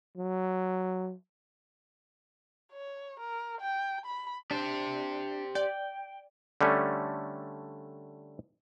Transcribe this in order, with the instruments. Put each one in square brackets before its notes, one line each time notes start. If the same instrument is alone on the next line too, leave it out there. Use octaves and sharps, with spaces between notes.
[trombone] F#3
[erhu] C#5
A#4
G5
B5
[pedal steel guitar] D4 [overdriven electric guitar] G4 C5
[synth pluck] D5 [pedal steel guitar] G5
[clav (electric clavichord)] D3 G3 A3 C#4